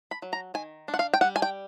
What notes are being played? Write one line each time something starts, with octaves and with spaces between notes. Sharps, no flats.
B5
F#3
A#5
D#3 G#5
D4
F#5
F5
G5
G3 F#5
G#5
G5